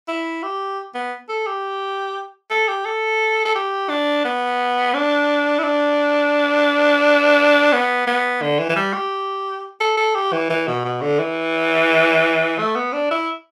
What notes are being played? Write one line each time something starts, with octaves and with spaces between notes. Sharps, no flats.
E4
G4
B3
A4
G4
A4
G4
A4
A4
G4
D4
B3
D4
E4
D4
B3
B3
D3
E3
E3
G3
G4
A4
A4
G4
E3
E3
B2
B2
D3
E3
A3
B3
D4
E4